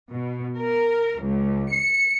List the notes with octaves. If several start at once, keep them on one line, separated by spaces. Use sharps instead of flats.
B2
A#4
C#2
C#7